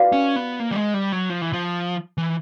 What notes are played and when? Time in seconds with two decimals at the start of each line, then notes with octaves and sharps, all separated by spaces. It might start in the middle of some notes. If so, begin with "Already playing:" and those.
Already playing: F#4 B4 D5 F5
0.12 C#4
0.36 B3
0.60 A#3
0.72 G3
0.76 G#3
0.94 G3
1.12 F#3
1.30 F3
1.41 E3
1.53 F3
2.18 E3